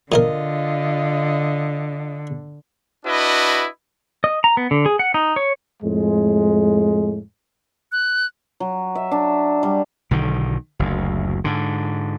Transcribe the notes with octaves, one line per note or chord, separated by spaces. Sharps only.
A#2 D3 D#4 F4 A#4 D#5
D4 E4 F#4 B4 D#5
D#5
A#5
B3
D3
G#4
F#5
D#4
C#5
F2 A2 G#3
F#6
F#3
E5
D4
G3
B1 D3 D#3
F#1 D2
G#2 D3